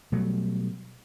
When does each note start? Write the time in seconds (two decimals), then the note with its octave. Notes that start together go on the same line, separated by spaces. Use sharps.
0.12 B2 F#3 G3 A3